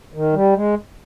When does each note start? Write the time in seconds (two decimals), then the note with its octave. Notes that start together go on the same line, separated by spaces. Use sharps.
0.14 D#3
0.33 G3
0.54 G#3